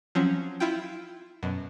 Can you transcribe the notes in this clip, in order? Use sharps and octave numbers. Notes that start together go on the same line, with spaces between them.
F3 F#3 C4 C#4
E4 F4 G5
F#2 B2